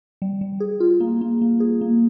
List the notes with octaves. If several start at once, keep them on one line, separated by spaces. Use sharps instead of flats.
G3
G3
G#4
F4
A#3
A#3
A#3
G#4
A#3